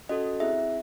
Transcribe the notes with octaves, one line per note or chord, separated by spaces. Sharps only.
C#4 F#4 A4 D#5
C4 E4 G#4 E5